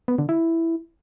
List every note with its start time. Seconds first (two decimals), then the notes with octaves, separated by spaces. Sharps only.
0.08 B3
0.18 D3
0.29 E4